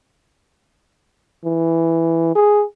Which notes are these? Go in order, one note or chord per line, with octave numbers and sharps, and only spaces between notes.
E3
G#4